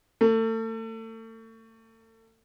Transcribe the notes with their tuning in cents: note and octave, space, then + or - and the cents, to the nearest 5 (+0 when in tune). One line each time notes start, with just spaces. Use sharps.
A3 +35